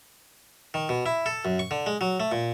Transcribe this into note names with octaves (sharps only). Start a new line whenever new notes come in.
D#3
B2
E4
A4
F#2
C#6
D3
G#3
F#3
A3
A#2